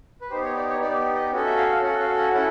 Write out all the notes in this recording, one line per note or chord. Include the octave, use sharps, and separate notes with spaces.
B4
B3 D#4 G4 C5
C#5
D5
C#5
B3 D#4 G4 D5
D#5
C#4 F#4 A4
E5
F5
F5
C#4 F#4 A4 F#5
F5
F#5
C#4 E4 A4 F#5